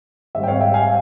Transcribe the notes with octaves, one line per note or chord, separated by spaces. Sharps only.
G#1 G#2 G3 E5
G5
C#5 F5
E5 G5
F5 G#5